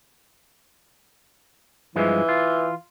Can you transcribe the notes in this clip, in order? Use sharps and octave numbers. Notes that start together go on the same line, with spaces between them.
G2 E3 F3 G#3
F4